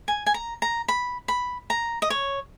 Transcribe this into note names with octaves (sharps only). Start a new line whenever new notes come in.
G#5
G#5
A#5
A#5
B5
B5
A#5
D#5
C#5